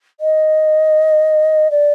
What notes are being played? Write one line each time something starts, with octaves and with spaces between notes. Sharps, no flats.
D#5
D5